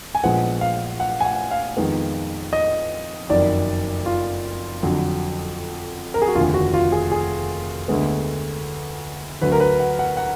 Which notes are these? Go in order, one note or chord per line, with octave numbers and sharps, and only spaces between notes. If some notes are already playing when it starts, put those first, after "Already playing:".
G#5
A#1 A#2 F3 G#3 B3 F#5
F5
F#5
G#5
F#5
F5
F2 D#3 G#3 B3
D#5
F#1 F2 D#3 F#3 D5
F4
F2 D3 F#3
A#4
G#4
F#4
F1 D#2 D3 F4
F#4
F4
G#4
G#4
D2 D3 G#3 B3
D2 D3 F#3 B4
A#4
B4
F#5
F#5
F#5